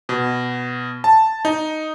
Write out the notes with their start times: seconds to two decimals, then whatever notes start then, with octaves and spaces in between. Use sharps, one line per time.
0.09 B2
1.04 A5
1.45 D#4